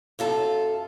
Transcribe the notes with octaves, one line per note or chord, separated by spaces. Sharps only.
F#2 F4 A4